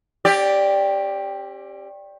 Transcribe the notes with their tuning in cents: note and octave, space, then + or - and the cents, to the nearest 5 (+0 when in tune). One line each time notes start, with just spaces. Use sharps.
C#4 -40 G4 +5 D5 +0